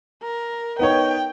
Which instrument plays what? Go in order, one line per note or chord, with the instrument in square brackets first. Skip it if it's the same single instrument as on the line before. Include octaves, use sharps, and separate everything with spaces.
[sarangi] A#4
[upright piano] B3 D#4 C#5 [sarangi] G5